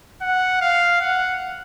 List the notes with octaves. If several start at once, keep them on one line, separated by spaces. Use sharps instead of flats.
F#5
F5
F#5